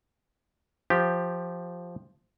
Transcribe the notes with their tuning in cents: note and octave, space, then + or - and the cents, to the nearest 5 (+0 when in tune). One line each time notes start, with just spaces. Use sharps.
F3 +0 G4 +0